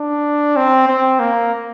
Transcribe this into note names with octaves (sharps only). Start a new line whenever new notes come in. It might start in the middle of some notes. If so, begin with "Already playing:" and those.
Already playing: D4
C4
C4
A#3